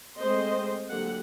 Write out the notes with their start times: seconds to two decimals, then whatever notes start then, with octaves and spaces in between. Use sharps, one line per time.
0.18 G#3 A3 C4 C5 D#5 C6
0.89 D3 F#3 A#3 G4 F#5